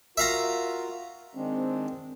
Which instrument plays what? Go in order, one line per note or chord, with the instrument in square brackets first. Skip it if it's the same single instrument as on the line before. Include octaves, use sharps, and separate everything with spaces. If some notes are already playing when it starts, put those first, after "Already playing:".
[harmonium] F4 F#4 A#4 [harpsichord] E5 F5 A#5
[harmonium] D#3 G#3 D4 [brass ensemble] C4